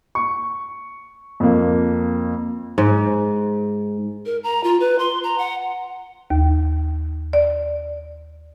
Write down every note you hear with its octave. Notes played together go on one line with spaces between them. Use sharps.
C#6
F2 A#3
G#2
A#4
A#5
F4
B4
C6
A#5
F#5
D#2
D5